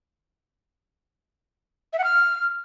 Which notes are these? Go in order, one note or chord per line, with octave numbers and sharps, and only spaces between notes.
E5
F#5
F6